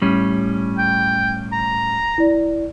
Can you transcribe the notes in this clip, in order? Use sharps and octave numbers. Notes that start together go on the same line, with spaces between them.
A2 G3 C#4
G5
A#5
E4 D5